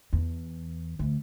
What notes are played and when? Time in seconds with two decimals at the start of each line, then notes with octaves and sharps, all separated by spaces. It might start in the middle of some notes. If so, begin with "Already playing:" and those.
0.13 E2
0.99 D2